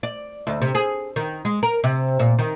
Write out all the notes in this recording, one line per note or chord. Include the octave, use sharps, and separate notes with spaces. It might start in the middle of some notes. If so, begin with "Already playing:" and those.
D5
D2
C3
G#4
D#3
G#3
A#4
C3
A#2
D#3